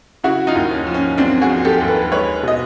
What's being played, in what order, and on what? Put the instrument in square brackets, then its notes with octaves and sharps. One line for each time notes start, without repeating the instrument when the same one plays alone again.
[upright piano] C#3 E4 F#4
D#4 F4
D#2
C#4
F3
C#4
D#2 C4 D4
F#4 G#4
F3
G4 A4
D#2
A4 B4
G#3 B4 C#5
B2 D#5